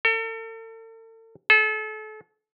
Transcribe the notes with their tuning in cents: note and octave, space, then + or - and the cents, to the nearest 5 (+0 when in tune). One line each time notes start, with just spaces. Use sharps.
A4 +40
A4 -35